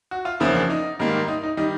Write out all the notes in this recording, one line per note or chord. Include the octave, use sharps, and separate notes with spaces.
F#4
F4
E2 C#3 F3 A#3 E4
D4
D#4
G#2 D#3 G3 A#3
D#4
D#4
D#3 G3 D#4